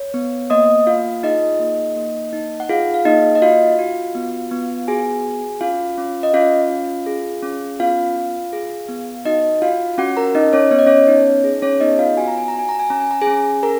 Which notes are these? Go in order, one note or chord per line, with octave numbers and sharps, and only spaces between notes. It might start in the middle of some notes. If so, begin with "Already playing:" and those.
Already playing: C#5
B3
A#3 D#5 D#6
F4 F5
D#4 G#4 D#5
A#3
A#3
D#4
F#5
F4 G#4 F5
F5
A#3 D#4 D#5
D#5
F4 F#4 F5
F#4
B3
B3
F#4 G#4 G#5
F#4
C#4 F4 F5
C#4
D#5
C#4 F4 F5
F4
G#4
C#4
B3 F4 F5
F4
G#4
B3
D#4 F#4 D#5
F4 F#4 F5
C#4 F#4 F#5
A#4 A#5
C#4 D#4 D#5
C#4 C#5
B3 C#5
D#5
C#4 C#5
D#4
G#4
C#4 C#5
B3 D#4 D#5
F4 F5
F#4 G#5
A#5
G#5
A#5
F#4
G#5
A#5
G#5
C#4 A#5
G#5
A#5
G#4 G#5
C#4
G#4 A#4 A#5